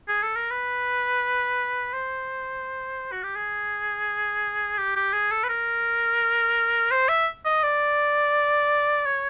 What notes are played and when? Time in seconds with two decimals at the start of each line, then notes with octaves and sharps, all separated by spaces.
0.08 G#4
0.23 A4
0.36 A#4
0.51 B4
1.93 C5
3.12 F#4
3.23 G4
3.36 G#4
4.78 G4
4.96 G4
5.13 G#4
5.31 A4
5.44 B4
5.49 A#4
6.91 C5
7.09 E5
7.45 D#5
7.63 D5
9.05 C#5